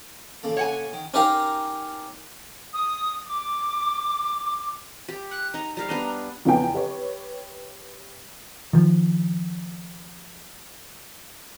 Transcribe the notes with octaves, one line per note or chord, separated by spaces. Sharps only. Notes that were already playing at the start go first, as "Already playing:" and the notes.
A#2 C#3 A4
C#5 F#5 G#5
D#3
C#4 D#4 G4 A#4 F5 A#5
D#6
D6
G4
F#6
D#4 A#5
G3 A#4 F5 A#5
B3 D4 D#5
E2 C#3 F3 B3 G5 G#5
G4 B4 C#5
D#3 F3